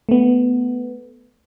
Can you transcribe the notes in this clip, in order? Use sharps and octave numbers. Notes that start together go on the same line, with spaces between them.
A3 B3